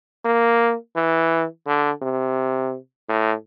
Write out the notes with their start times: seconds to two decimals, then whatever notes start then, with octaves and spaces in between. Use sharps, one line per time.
0.25 A#3
0.96 E3
1.67 D3
2.02 C3
3.09 A2